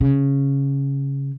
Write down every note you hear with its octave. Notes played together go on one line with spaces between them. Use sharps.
C#3